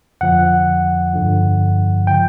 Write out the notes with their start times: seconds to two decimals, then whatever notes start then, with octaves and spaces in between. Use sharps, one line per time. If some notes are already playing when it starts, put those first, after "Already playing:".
0.21 F2 D3 F3 F#5
1.14 G2 D3 F3
2.07 C#3 F3 G5